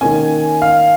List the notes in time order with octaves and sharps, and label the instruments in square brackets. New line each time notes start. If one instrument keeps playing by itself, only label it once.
[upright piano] D#3 A#3 C#4 G#5
F5